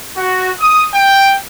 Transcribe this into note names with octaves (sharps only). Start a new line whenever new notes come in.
F#4
D#6
G5